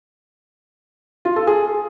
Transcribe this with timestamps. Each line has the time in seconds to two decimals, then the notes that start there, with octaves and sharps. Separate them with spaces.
1.25 F4
1.36 A4
1.47 G#4